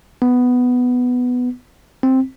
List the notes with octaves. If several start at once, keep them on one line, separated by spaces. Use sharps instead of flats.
B3
C4